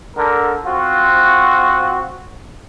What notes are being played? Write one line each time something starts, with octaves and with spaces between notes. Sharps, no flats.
D3 A#4
C4 F4 F#4